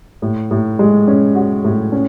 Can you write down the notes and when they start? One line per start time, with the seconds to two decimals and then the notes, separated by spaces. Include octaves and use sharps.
0.22 A2
0.51 A2
0.79 G#3
1.08 C#4
1.35 F#4
1.64 A2
1.92 C#4